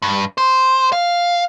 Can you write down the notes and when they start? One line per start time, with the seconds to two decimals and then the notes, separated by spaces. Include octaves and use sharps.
0.02 G2
0.38 C5
0.93 F5